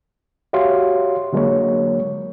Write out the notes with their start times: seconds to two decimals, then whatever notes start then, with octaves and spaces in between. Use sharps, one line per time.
0.53 F#4 G4 C#5 E5 F5 C6
1.33 D3 F#3 G#3 A#3 A#4 C#5